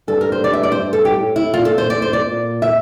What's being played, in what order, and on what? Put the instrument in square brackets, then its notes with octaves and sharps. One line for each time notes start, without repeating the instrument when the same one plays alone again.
[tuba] G2 [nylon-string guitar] A4
[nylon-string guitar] A#4
C5
D5
E5
D5
C5
[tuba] G2
[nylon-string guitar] A4
G4
[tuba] A2
[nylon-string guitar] E4
[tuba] A#2 [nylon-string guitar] F4
[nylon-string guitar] A4
C5
D5
C5
D5
[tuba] A#2
[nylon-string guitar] E5